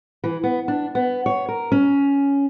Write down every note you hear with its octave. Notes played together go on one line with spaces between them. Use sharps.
E3
B3
D4
B3
C#5
A#4
C#4